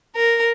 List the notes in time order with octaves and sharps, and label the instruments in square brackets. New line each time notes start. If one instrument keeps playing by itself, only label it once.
[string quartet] A#4